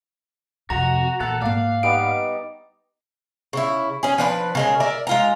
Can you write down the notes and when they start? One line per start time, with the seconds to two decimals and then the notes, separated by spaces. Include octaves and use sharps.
0.70 F2 C3 F#4 A#5
1.20 A#2 E3 A4 F#5
1.42 G#2 A#3 D5 F5
1.83 G3 B3 D#4 D7
3.53 C#3 E4
4.03 C#4 G#4
4.18 F3 D4 B4
4.55 C#3 G#3 A#4
4.80 A#4 D5 E5
5.07 G#3 F4 A#5